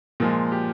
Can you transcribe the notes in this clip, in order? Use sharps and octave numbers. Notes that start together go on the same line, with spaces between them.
A#2 F3 G#3 A#4
G4